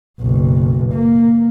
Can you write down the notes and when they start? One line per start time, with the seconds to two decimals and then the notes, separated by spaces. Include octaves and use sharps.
0.21 F#1 B1
0.93 A#3